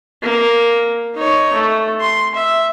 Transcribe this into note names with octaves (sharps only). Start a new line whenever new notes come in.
A#3
D#4 C#5
A3
C6
E5